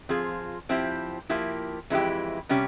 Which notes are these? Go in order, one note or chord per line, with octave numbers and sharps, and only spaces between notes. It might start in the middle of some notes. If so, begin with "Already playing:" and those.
F3 C4 F4 G#4
F3 C4 E4 G4
F3 A#3 E4 G4
F2 E3 G#3 E4 G4
C3 G3 C#4 G4